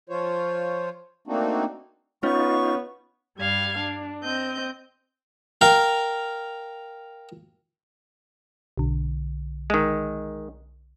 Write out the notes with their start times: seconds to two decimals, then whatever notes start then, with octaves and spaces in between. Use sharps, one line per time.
0.09 F3 F4 C5 C#5
1.27 A3 A#3 C4 D4 D#4 F#4
2.23 B3 C#4 D#4 F4 C#6
3.37 G2 G3 F5 G#6
3.80 D4
4.23 C4 D#5 G6
5.61 A#4 F5 G5
8.77 B1 D3
9.70 D#3 G#3